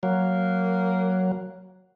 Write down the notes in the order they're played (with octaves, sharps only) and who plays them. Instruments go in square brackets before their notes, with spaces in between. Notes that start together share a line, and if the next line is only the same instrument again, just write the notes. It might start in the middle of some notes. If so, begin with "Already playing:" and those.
[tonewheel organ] F#3 [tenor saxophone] A#3